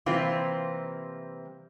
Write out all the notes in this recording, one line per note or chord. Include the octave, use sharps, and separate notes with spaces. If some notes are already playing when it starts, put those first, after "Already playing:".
C3 E3 G3 A#3 C4 F4